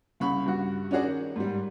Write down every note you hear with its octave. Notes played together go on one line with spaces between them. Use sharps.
C2 C#3 B5 C#6
G2 F#4
C#4 D4 F#4 G#4 D5
D#3
G#2 G3